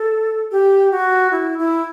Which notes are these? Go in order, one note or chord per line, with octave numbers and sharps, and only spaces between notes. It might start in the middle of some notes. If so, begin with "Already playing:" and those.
Already playing: A4
G4
F#4
E4
E4